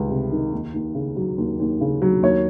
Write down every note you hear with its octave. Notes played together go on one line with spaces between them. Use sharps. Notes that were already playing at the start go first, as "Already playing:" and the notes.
Already playing: C#2 D#3 G3
C3
D#3
D#2
D#2
C#3
F#3
D#2
D#2
C#3
F#3
D#2 C#5